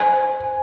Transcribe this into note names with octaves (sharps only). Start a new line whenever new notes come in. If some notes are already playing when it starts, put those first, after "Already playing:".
Already playing: C5 G#5
C5
G#5